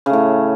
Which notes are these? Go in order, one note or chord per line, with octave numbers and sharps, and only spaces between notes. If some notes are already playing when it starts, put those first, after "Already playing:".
A2 C#3 A3